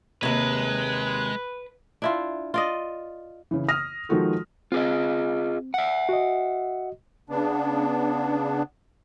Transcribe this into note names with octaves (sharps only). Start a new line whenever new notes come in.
D#2 G#2 C3 G#3 B4
D4 E4 F4
F4 D5 D#5
C#3 E3
D#6 F6 A#6
D#3 F3 G#3 F4 F#4 A4
C4 F4 G#4 D#5
E5 F#5
F#4 D#5
C#3 B3 D4